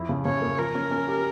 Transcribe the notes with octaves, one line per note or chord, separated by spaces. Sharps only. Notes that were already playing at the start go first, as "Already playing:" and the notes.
Already playing: F2 E4
C#3
C#3 C#5
A#3
F3 A#4
C#4
C#4
G4